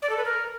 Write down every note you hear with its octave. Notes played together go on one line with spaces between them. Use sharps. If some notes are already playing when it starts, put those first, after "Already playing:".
D5
A4
B4
A#4